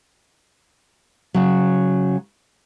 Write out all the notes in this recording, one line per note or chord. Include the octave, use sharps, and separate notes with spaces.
C#3 F#3